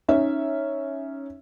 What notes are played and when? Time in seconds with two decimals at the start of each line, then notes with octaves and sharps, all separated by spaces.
0.08 C#4 D#4 E5